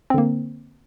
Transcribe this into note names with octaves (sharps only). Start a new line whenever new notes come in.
D3 A#3 C4